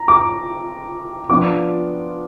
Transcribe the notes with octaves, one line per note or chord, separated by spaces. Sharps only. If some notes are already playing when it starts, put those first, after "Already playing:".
Already playing: A#5
D6
F3 B3 D4 F4 D6